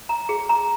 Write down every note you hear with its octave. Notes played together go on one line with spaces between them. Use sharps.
A#5
G#4
A#5